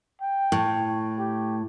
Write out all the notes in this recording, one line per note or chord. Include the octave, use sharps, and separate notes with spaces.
G5
A2
G4